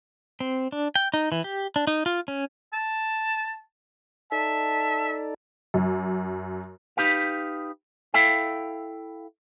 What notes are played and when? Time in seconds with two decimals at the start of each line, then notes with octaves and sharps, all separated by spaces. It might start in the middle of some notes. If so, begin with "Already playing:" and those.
0.40 C4
0.72 D4
0.95 G5
1.14 D#4
1.32 E3
1.44 G4
1.76 D4
1.87 D#4
2.06 F4
2.28 C#4
2.73 A5
4.32 D#4 A4 D5 E5 A5
5.74 F#2
6.97 D#4 G4 B4 F5
8.14 E4 A4 E5 F5 G5